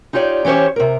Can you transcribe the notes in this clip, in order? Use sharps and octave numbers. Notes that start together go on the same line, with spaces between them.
D#4 F4 G4 C#5 D5
E3 C#4 G4 C5 C#5
C3 A#4